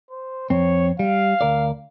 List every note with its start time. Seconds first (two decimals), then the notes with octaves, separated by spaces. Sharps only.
0.10 C5
0.50 F2 C4 C#5
0.99 G3 F5
1.41 D2 A#4 D5